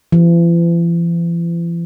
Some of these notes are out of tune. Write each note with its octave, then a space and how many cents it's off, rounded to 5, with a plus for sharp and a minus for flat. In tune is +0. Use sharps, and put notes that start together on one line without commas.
E3 +45